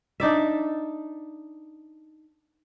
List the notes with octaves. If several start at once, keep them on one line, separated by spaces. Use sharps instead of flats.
D4 D#4 D5 E5